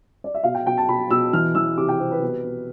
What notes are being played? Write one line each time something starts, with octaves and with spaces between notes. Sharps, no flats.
D5
E5
B2 F5
G5
B2 G5
A5
B2 B5
B2 E6
E3 F6
E3 E6
C3 D6
G5
C3 C5
B4
B2
B2